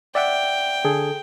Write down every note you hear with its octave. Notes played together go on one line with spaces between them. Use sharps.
D5 E5 F#5 G5
D3 G#4 A4